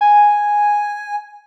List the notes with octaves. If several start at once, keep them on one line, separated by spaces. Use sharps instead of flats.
G#5